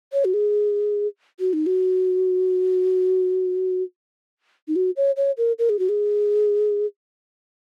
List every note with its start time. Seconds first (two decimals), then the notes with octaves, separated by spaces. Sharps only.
0.13 C#5
0.25 F#4
0.34 G#4
1.40 F#4
1.53 D#4
1.66 F#4
4.68 D#4
4.76 F#4
4.97 C#5
5.17 C#5
5.38 A#4
5.59 A#4
5.69 G#4
5.79 F#4
5.89 G#4